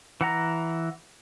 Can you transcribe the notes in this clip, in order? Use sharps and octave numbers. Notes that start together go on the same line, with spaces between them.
E3 F#5 A#5